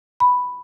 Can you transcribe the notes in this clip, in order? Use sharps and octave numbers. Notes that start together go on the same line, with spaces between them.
B5